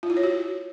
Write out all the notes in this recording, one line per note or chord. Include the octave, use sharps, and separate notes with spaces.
F4
E4
C#5
F#4